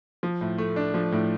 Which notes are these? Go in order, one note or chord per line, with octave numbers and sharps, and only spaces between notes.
F3
A2
A3
D4
F3
A2